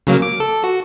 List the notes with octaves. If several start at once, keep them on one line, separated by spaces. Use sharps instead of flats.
C#3 F#3 A#3
D6
A4
F#4